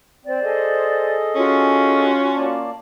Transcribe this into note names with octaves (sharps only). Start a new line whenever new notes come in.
C4 C5 D5
G#4 A4 D#5
C#4 F4 F#4
A#3 D5 A5